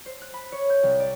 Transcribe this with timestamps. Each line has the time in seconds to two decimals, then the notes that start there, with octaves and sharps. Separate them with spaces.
0.06 C5
0.21 F#6
0.34 B5
0.52 C#5
0.70 G6
0.83 C2
1.00 D5